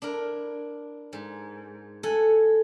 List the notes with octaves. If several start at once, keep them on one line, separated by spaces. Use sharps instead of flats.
D4 E4 A#4
G#2
A4 F#5 G#5